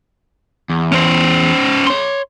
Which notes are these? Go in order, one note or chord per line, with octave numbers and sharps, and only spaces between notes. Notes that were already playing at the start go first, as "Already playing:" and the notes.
E2
C#4 C5
C#5 C6